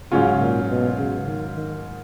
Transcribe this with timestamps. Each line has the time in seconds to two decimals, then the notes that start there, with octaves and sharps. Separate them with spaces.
0.11 G#2 C#3 F#3 C#4 F4
0.40 A#2
0.70 B2
0.98 C#3
1.26 D#3
1.55 D#3